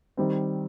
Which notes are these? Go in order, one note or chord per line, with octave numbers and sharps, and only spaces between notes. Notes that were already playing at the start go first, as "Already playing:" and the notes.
D#3 G3 C4